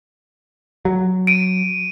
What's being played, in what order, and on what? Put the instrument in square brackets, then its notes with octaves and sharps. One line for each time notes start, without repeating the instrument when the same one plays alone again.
[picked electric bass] F#3
[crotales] D7 D#7